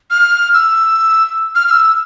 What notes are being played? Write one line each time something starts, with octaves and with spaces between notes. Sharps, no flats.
F6
E6
F6
F6
E6